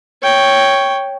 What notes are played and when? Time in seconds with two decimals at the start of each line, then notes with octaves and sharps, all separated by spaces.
0.23 C#5 G5